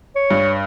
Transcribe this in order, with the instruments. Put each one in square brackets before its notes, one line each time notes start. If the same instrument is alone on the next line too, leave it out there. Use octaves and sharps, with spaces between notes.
[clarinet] C#5
[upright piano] G2